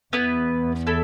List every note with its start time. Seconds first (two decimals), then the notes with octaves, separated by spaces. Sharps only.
0.12 E2 B3 E4 B4
0.87 E4 A4 E5